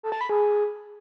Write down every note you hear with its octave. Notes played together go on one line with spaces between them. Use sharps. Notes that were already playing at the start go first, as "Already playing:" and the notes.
A4
A5
B5
G#4